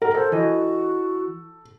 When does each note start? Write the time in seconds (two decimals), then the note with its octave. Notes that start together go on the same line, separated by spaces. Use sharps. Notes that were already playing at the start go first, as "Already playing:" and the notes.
0.02 A#4 F#5
0.15 A4 C5
0.32 E3 F#4 D#5